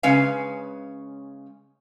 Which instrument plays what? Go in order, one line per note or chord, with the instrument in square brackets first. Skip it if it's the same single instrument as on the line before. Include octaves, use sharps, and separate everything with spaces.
[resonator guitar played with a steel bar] C#3 G#3 C#4 B4 F5